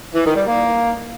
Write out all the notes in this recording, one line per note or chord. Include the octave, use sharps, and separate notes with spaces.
E3
D#3
G3
A#3